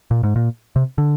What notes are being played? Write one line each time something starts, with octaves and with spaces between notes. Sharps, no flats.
A#2
G#2
A#2
C3
D3